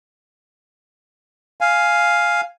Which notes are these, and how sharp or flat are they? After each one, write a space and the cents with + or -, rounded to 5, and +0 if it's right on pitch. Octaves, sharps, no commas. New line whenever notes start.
F5 +0 G#5 +0